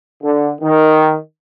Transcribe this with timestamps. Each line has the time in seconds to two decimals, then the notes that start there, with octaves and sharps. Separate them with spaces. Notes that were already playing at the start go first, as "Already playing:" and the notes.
0.23 D3
0.61 D#3